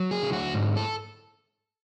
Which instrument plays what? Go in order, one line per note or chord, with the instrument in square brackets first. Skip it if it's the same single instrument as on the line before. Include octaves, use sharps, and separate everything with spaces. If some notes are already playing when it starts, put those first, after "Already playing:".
Already playing: [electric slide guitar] F#3
G#4
D3
F#4
G#2
A4